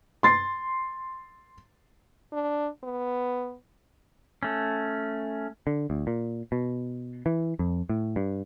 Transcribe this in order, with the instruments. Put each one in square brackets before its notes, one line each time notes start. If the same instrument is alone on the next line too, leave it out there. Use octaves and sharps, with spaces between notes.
[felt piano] C6 A6 C7
[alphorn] D4
B3
[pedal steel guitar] A3 C#4
[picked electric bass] D3
D2
A#2
B2
E3
F2
A2
G2